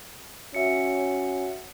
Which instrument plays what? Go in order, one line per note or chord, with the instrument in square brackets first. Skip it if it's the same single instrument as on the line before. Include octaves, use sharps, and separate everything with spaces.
[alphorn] C#4 [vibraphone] F#4 F#5 [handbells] E5 C#7